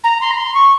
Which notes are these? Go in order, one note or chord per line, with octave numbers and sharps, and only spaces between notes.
A#5
C6
A#5
C6
C#6